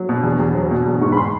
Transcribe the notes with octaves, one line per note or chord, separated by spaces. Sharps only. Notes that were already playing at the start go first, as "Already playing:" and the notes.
Already playing: F#3
B2
E2
E2
F#3
B2
E2
G#2 C#6
B5
C6